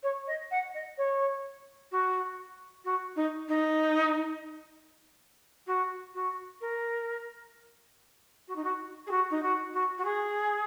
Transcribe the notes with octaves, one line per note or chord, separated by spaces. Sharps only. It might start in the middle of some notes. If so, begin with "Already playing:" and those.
C#5
D#5
F#5
D#5
C#5
F#4
F#4
D#4
D#4
F#4
F#4
A#4
F#4
D#4
F#4
G#4
F#4
D#4
F#4
F#4
F#4
G#4